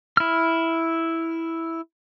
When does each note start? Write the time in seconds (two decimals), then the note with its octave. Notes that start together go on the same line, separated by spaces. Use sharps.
0.17 E4 F6